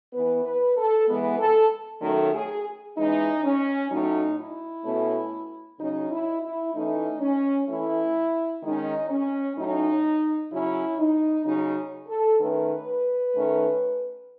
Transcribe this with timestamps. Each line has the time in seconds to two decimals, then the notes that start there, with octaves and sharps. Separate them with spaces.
0.13 E3 B3 B4
0.45 B4
0.77 A4
1.07 E3 G#3 B3
1.39 A4
2.01 D#3 F#3 A3 C#4 A4
2.33 G#4
2.96 E3 G#3 C#4 D#4
3.44 C#4
3.91 A2 F#3 C#4 D#4
4.38 E4
4.85 B2 A3 C#4
5.79 C#3 F#3 C#4 D#4
6.11 E4
6.42 E4
6.74 E3 A3 C#4 D#4
7.21 C#4
7.68 E3 A3 C#4 E4
8.62 D#3 G#3 C#4 D#4
9.10 C#4
9.57 A2 F#3 C#4 D#4
10.51 C#3 F#3 C#4 E4
10.98 D#4
11.46 C#3 F#3 C#4 D#4
12.08 A4
12.40 D#3 A3 C#4 B4
13.35 D#3 A3 C#4